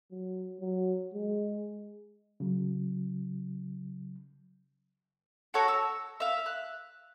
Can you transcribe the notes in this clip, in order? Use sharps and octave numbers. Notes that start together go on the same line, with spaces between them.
F#3
F#3
G#3
C#3 F#3
F#4 A4 C#5 A#5
E6
E5 F5
F#6